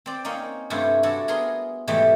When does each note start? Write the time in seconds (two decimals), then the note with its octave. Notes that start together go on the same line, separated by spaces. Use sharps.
0.06 C4 D5
0.25 A#3 C4 C#4 D#4
0.70 G2 C3 A3 C#4 E4 F4
1.03 D4 E4 F#4 A4
1.28 B3 G#4 A#4 C6
1.88 G#2 B2 E3 G3 A3